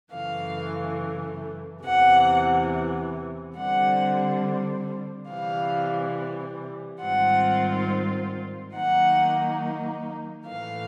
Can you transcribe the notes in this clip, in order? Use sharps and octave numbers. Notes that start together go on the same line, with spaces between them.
F#2 C#3 E3 A3 F5
E2 C3 E3 F#5
D3 G3 C4 F#5
C3 E3 G3 F5
G#2 D#3 G3 C4 F4 F#5
D#3 F#3 A#3 D#4 F#5
A2 E3 A3 F5